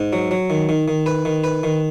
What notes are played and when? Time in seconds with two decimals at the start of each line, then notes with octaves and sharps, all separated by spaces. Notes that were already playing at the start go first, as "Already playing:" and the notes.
Already playing: G#2
0.13 F#3
0.31 F#3
0.50 D#3
0.69 D#3
0.88 D#3
1.06 B4
1.25 D#3
1.44 B4
1.63 D#3